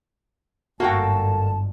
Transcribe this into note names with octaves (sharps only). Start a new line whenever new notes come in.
G1 G#2 A#3 F#4 A4 G5 A5